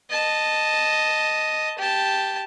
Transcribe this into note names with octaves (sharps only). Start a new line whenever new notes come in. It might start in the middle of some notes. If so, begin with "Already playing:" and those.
D#5 A5
G4 A5